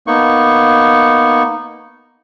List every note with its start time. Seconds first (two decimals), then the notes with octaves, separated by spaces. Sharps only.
0.07 A#3 B3 D#4 C#6